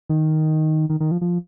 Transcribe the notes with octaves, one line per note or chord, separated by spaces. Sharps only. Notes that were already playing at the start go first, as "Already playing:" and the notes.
D#3
D#3
D#3
F3
F3